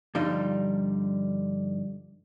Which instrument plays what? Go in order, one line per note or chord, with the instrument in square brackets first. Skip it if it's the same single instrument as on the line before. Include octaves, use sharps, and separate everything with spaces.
[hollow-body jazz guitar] G2 D3 F3 G3 D#4